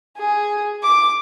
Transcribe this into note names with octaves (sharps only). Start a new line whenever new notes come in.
G#4
D6